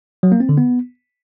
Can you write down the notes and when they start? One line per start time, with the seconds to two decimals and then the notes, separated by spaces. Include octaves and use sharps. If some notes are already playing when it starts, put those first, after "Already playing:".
0.23 F#3
0.32 A#3
0.40 C4
0.49 D3
0.58 B3